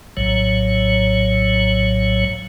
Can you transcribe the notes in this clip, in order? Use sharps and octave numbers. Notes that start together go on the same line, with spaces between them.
A#1 A2 F#3 C#5